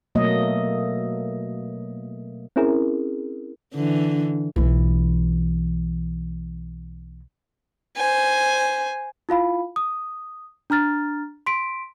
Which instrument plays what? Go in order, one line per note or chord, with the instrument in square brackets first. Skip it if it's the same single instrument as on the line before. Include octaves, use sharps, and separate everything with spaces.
[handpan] B2 F#3 A3 A#3 D#5
[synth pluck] C4 C#4 E4 G#4 A#4
[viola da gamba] D3 E3
[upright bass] B1 E3
[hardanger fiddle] C5 G#5
[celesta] E4 F4 F5 B5
D#6
D4 A#5 F6 A6
C6 B6 D7